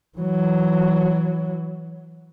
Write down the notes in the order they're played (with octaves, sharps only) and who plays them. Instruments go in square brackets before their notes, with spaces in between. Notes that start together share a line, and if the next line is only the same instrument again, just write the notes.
[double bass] E3 F#3